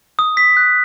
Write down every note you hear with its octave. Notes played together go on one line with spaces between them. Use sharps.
D#6
B6
F#6